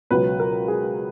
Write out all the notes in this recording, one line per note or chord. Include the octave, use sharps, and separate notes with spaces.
C#2 B2 F#3 B4
A#4
G#4